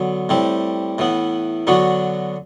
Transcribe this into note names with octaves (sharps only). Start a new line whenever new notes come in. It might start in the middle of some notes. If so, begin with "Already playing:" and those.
Already playing: D3 F#3 B3
A2 G3 C4 G4
A2 E3 B3
D3 F#3 B3 D4 F#4